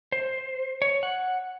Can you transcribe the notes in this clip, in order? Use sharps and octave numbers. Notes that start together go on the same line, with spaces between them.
C5
C#5
F#5